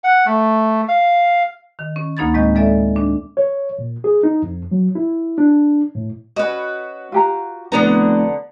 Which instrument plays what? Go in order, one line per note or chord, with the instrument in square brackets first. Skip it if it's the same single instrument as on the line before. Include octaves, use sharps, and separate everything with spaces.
[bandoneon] F#5
A3
F5
[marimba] D#3
C#4
D2 A#3 D#4 B5 G#6 A6
A2 G#3 C4 D#5 G6
G#3 A4 D5 E5
D4
[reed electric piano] C#5
A#2
G#4
D#4
F2
F#3
E4
D4
A2
[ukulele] C#4 D#5 [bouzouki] F#4 B4
[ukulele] F4 G4 A#5
[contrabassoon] F1 [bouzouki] D3 B3 A#5 [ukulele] B4